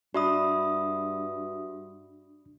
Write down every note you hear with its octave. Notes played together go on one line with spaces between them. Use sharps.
G2 D4 F#4 E5 B5 D#6